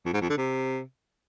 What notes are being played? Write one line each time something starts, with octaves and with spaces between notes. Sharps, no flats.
F2
G#2
F2
D3
C3